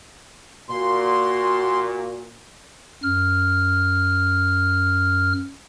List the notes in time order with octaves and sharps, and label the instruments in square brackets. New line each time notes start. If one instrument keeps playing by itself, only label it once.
[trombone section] A#2 [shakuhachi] F#4 [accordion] C6
[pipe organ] F#2 F6